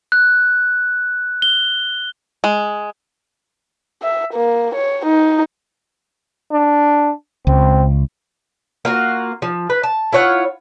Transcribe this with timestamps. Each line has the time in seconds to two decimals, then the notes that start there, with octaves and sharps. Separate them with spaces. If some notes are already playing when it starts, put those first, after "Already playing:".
0.12 F#6
1.42 G7
2.44 G#3
4.02 E5
4.34 A#3
4.75 C#5
5.06 D#4
6.52 D4
7.47 C#2 C4
8.85 A#3 F4 F#4
9.42 F3
9.70 B4
9.83 A5
10.12 E4 F4 C#5 F#5